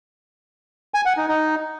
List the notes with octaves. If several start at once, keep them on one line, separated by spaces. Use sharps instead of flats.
G#5
F#5
D#4
D#4